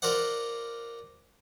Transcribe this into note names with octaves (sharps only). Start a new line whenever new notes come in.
F4 A#4 C5 D5 F#5